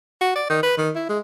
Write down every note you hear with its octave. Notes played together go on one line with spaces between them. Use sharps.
F#4
D5
D#3
B4
D#3
E4
G#3